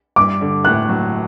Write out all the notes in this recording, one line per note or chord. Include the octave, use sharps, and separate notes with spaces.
G2 D6
D3
A2 F#6
F#3